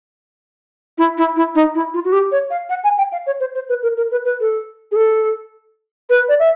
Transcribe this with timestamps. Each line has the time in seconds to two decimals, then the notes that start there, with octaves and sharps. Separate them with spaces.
0.98 E4
1.18 E4
1.36 E4
1.55 D#4
1.75 E4
1.94 F4
2.05 F#4
2.12 G4
2.32 C#5
2.51 F5
2.69 F#5
2.84 G#5
2.98 G5
3.12 F5
3.27 C#5
3.40 C5
3.55 C5
3.69 B4
3.83 A#4
3.97 A#4
4.12 B4
4.25 B4
4.40 A4
4.92 G#4
4.96 A4
6.10 B4
6.29 D5
6.39 E5